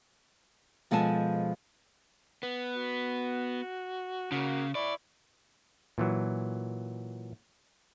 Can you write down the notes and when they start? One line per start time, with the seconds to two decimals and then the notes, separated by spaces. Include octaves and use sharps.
0.91 B2 F3 G#3 A4 G#5 A5
2.43 B3
2.74 F#4
4.32 C#3 A#3 F#4
4.75 E4 D5 B5 C#6
5.98 A#2 E3 F#3